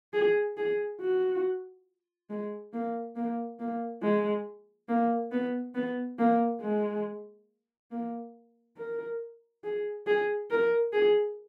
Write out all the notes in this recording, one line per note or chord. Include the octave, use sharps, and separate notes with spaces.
G#4
G#4
F#4
G#3
A#3
A#3
A#3
G#3
A#3
B3
B3
A#3
G#3
A#3
A#4
G#4
G#4
A#4
G#4